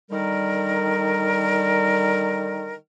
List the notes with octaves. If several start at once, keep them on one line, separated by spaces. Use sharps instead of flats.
D3 D#3 G3 A#4